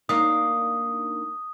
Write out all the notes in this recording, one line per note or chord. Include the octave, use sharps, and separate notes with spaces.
A#3 D4 D#4 D#6